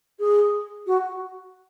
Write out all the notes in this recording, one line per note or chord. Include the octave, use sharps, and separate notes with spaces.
G#4
F#4